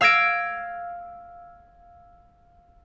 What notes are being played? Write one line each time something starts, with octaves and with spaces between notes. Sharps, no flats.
F5 E6 G#6 A#6 D7